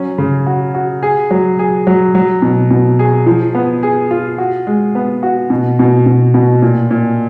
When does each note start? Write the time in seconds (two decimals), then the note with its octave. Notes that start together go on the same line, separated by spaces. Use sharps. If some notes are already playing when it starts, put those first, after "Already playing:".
Already playing: F#3 C#4
0.18 C#3
0.47 F#4
0.75 F#4
1.03 G#4
1.31 F#3
1.59 G#4
1.87 F#3
2.15 F#3
2.42 B2
2.71 B2
2.99 G#4
3.26 F3
3.55 B3
3.83 G#4
4.11 F4
4.38 F#4
4.67 G#3
4.95 B3
5.23 F#4
5.50 B2
5.79 B2
6.06 B2
6.34 B2
6.62 A#2
6.91 A#2